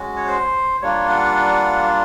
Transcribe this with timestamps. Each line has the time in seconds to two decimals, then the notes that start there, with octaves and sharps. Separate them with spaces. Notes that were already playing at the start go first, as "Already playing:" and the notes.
Already playing: G#3 C#4 F#4
0.16 C#5
0.27 C5
0.82 G3 A#3 D4 F4 C#5
1.09 F#5